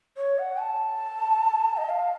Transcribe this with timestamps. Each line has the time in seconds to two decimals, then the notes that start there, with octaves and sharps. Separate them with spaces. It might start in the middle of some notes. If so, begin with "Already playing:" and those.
0.17 C#5
0.39 F#5
0.60 A5
1.77 D#5
1.89 F5